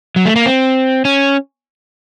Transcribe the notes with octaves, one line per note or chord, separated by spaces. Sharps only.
F#3
A3
A#3
C4
C#4